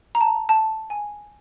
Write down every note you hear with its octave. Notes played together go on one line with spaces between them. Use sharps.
A#5
A5
A5
G#5